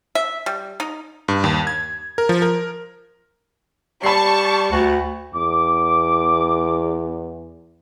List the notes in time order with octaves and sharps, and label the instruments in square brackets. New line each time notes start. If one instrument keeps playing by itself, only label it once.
[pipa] E5
G3
D#4
[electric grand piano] G2
D#2
G#6
A#4
F3
A#4
[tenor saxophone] G3 [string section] A5 C#6 [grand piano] B5 C7
[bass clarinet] D2 [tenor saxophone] F#4
[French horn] E2 [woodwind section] D6